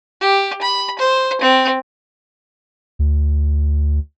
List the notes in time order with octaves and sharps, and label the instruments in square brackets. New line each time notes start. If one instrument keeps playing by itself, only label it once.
[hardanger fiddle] G4
B5
C5
C4
[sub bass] D2